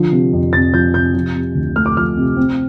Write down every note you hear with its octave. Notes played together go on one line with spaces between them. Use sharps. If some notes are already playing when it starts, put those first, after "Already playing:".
Already playing: D3 F3 C7
C3
F2
F2 A6
F3 G6
C3 G6
F3
C3
D2
A3 F6
D6
F3 F6
C3
C4